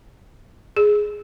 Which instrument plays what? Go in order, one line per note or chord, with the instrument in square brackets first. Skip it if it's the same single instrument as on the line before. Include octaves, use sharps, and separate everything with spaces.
[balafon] G#4